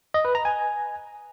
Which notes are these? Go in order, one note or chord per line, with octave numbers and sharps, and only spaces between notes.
D#5
B4
A#5
G#5